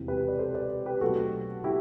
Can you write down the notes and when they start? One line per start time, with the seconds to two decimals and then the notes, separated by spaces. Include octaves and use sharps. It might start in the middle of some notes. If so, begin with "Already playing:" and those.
Already playing: E1 E2 C3 E3
0.08 G4 B4
0.28 D5
0.39 A4 C5
0.55 B4 D5
0.86 G4 B4
1.01 B1 B2 A3 C4 F#4 A4
1.64 E4 G4